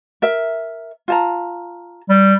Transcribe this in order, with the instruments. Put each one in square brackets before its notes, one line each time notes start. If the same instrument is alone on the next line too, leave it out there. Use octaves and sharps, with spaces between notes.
[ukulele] A#4 E5
F4 A5 A#5
[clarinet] G3